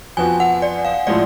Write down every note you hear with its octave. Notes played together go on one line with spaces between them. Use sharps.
F2 F3 B3 F#4 G#5
F#5
D5
F5
A2 F3 G#3 D5